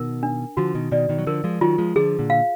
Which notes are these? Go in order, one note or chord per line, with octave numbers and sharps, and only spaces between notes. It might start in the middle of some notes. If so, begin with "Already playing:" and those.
Already playing: B2 D#3 A#4
D4
D3 F3 F#4
B2 D#3
B2 D#3 D5
B2 D#3
F#3
D3 F3 A#4
F3 G#3
D#3 F#3 F4
F3 G#3
D3 F3 G#4
A#2 D3
F5